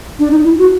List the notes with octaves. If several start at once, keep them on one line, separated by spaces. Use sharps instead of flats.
D4
D#4
E4
F#4